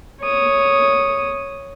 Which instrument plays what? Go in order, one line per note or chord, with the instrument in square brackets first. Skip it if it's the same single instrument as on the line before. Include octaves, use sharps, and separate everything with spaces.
[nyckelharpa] C#5 D#6